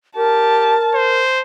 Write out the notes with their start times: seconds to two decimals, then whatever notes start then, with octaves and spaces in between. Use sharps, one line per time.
0.16 G4 A#4 A5
0.94 C5